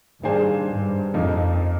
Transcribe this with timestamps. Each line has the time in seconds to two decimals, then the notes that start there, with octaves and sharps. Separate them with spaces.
0.22 G2 D#3 A#3 D4 G#4 C5
0.69 G2
1.14 F2 A#2 F3 A#3 D#4